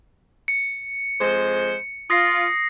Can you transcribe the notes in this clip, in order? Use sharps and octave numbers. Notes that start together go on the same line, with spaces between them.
C#7
F2 G#3 C5
F4 D#6 A#6 C7